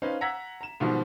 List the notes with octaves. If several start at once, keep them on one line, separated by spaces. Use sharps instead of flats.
C#4 D#4 B4 C5 F5
F#5 A#5 E6 G#6 A#6 B6
A#5 E7
G#2 B2 D#3 F3 G3